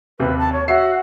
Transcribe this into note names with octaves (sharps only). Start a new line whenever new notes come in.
D#2 C3 B4
A5
C#5
F#4 C#5 E5 C7